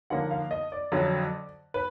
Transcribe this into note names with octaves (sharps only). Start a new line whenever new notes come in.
D#2 D3 F3 A#3 F#5
F5
D#5
D5
F2 D3 F#3
B4